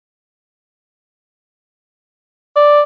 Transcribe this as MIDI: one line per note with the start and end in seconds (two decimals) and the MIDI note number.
2.56 2.81 74